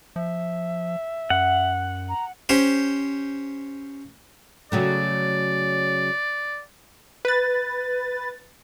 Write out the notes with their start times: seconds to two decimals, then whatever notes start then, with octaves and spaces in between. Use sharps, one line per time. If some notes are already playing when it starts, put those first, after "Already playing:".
0.16 F3 E5
1.30 F#2 F#5
2.09 A#5
2.49 C#4 G4 C5
4.72 C#3 F#3 A3 D5
7.25 B4 A6